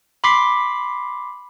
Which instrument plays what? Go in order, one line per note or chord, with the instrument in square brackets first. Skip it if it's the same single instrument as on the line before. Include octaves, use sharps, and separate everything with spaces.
[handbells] B5 C6 D6 B6 C7